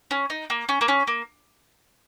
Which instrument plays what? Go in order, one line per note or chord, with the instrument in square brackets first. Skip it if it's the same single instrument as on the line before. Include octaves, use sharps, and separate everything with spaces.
[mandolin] C#4
D#4
A#3
C#4
A#3
C#4
A#3